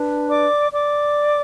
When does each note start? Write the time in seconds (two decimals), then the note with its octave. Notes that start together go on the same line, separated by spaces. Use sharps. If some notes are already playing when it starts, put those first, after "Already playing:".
Already playing: D4 B4
0.29 D5 D6
0.72 D5 D6